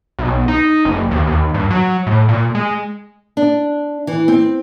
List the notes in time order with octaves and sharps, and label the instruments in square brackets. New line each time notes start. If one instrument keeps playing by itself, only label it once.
[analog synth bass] B1
D#4
F#1
D#2
D#2
G2
F#3
A2
A#2
G#3
[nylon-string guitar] D4
E3
C4